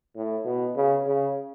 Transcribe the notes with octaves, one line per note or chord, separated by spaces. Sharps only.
A2
B2
C#3
C#3